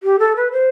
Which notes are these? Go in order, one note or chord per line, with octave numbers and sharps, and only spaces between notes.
G4
A4
B4
C5